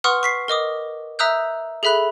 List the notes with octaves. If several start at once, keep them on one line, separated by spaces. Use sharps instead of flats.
B4 F#5 C6 C#6 D#6 F6
C#6 B6 C7
A#4 D#5 D6 D#6
E5 A#5 D#6 E6 F#6 G6
G#4 A4 E5 B5 F#6